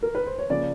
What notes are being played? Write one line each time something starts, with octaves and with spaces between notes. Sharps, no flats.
A#4
B4
C5
C#5
C#3 F3 A#3 C#4 D5